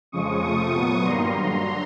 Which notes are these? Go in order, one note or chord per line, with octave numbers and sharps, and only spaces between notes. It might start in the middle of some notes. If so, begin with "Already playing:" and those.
F2 C#3 F3 G#3 C#6 D#6
C3 F3 A3 C#6 D#6
A#2 F#3 B3
G2 D#3 G3 A#3 A#5 C6
G2 D3 F#3